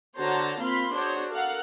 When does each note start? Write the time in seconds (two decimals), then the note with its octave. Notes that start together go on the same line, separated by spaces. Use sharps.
0.18 D3 F#4 C5 C#5 A5 A#5
0.60 A#3 C4 F4 F5 B5 C6
0.94 D4 F#4 G#4 C5 C#5
1.31 A4 A#4 F5 F#5